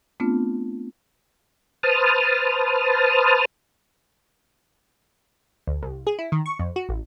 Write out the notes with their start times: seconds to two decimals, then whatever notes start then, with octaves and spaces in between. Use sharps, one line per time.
0.20 A3 B3 C4 D4 F4
1.83 B4 C5 A5 D#6 F6
5.67 D2
5.83 C2
6.07 G#4
6.19 E4
6.32 D#3
6.46 C#6
6.59 F2
6.76 F#4
6.89 A1